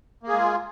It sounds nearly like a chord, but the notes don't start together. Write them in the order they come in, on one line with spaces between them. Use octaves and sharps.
A#3 G#4 G#3 F4